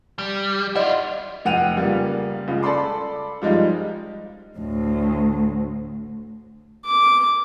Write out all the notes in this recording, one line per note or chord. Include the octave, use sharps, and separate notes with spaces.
G3
E4 F4 D5 D#5 F#5
F1 F#5 G5 D#7 F7
C#3 G3 A#3 F4
C#2 C#3
A4 D5 B5 C6 D6
F3 G3 G#3 D#4 F4
D2 A2
D6